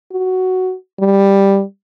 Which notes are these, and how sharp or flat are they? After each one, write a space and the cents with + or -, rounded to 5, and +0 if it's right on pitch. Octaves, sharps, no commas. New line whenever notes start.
F#4 +5
G3 +5